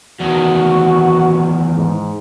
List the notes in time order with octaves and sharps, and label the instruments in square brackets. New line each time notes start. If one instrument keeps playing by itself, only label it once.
[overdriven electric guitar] E2 D#3 [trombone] F#4
[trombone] G#2